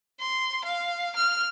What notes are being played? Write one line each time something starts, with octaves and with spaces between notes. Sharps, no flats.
C6
F5
F6